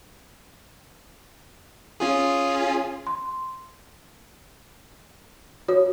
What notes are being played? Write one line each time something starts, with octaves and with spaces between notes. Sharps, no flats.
C#4 F4 G#4
C6
F#4 C#5